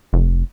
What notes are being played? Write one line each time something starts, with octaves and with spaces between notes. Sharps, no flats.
F1